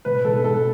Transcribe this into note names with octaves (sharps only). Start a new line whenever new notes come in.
B2 B4
B2 A4
B2 A4